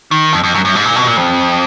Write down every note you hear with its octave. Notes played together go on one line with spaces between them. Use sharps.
D#3
F2
F2
F#2
F#2
G#2
A#2
B2
A#2
F2